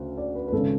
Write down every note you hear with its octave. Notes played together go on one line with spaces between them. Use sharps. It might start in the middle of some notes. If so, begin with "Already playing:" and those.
Already playing: D2 C#3
D5
B4
B4
G#1 C#3 A4